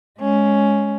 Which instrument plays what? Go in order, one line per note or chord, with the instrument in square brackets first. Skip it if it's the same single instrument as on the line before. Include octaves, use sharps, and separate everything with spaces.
[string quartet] G#3 C#4